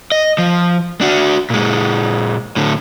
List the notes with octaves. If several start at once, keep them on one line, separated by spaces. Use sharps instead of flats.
D#5
F3
D4 F#4
A#2 G#3
A2 D3